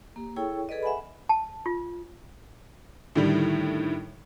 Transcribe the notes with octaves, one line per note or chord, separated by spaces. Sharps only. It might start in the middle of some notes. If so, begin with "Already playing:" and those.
A#3 G4
E4 G#4 A4 C#5 G5 C#6
G#4 A4 B4 D5 D#5
E5 F#5 G#5 B5
A5
F4
A2 D3 D#3 G3